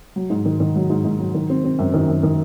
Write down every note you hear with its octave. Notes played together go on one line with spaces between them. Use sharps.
F#3
G#2
D#3
D#3
F#3
G#2
G#2
F#3
D#3
C4
C4
F#2
D#3
F#2
D#3